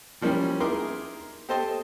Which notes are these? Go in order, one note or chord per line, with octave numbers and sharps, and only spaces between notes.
E3 F3 G3 A#3 C#4
D#4 E4 G#4 A#4 C6 D6
G4 A4 C5 D#5 A5 C6